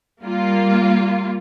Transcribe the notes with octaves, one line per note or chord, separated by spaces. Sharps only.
G3 A#3 F4